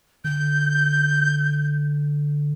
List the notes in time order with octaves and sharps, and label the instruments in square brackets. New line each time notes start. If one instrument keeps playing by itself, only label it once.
[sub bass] D3 [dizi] G6